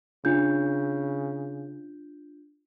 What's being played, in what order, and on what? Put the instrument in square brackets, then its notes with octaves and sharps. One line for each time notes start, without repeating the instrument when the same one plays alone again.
[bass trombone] C#3 [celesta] D4 F4 G6